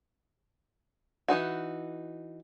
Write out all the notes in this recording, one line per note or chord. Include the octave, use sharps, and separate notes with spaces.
E3 F#3 D#4 F#4